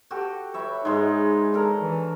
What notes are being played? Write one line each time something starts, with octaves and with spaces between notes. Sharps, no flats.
F#4 G4 A4
C#5 E5 B5
G#2 G#3 D#4
D4 A4 A#4
E3